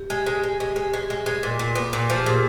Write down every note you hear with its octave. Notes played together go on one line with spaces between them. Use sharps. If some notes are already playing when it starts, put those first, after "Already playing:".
Already playing: G4
G#3
G#3 G4
G#3
G#3 G#4
G#3
G#3
G#3
G#3
A#2
A#2
B3
A#2
F3
G4
A#2 G#4